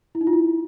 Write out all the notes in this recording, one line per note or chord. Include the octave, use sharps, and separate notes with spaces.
E4
D#4
F4
E4